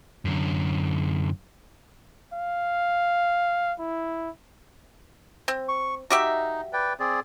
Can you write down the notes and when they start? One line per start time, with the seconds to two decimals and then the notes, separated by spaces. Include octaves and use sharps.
0.25 F#2 D3
2.33 F5
3.79 E4
5.48 C4
5.69 C#6
6.10 D#4 F#4 G4 E5
6.73 B4 D5 G5
7.00 C4 G#4 D5